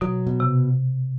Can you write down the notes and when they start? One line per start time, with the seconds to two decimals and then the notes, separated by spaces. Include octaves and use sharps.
0.01 B2 F#3
0.27 B2
0.40 C3